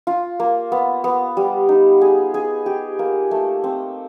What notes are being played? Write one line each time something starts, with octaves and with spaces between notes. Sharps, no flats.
F4
A#3
B3
B3
G3
D#4
G#4
G#4
G4
A#3
A3
C4